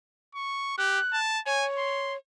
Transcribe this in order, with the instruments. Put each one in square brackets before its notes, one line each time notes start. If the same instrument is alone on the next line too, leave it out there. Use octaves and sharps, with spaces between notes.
[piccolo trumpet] C#6
[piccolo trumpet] G4 [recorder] F#6
[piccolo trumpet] A5
[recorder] C#5 [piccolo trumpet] G#5
[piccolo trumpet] C6